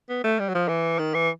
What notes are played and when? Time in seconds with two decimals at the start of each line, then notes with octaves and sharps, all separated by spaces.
0.09 B3
0.24 A3
0.39 G3
0.49 F#3
0.54 F3
0.68 E3
0.99 D#3
1.14 E3